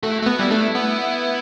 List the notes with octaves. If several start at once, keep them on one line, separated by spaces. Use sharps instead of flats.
A3 F#4
E4
A3 F#4
B3
G3 E4
A3 D4
E4
B3